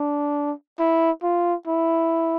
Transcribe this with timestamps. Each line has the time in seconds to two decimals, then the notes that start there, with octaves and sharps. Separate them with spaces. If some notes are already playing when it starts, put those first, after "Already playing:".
Already playing: D4
0.79 E4
1.23 F4
1.67 E4